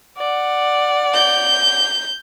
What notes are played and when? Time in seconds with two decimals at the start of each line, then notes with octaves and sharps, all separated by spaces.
0.18 D5 F#5
1.14 G6